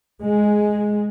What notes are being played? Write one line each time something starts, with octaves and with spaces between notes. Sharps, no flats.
G#3